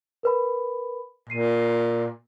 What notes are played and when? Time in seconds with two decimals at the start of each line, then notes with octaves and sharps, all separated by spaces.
0.23 A#4 B4 B5
1.30 A#2 C7 D#7